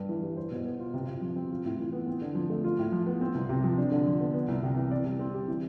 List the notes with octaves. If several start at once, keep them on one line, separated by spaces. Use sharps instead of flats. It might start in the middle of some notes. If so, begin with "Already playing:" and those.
Already playing: G2
E3
G3
C5
B2
B3
F4
C3
C3
F3
C4
F4
A2
E3
B3
C4
D3
F3
A3
F4
A2
F3
B3
C4
C2
C3
F3
D4
D3
F3
B3
B3
C2
C3
E3
D5
G3
C4
G4
E3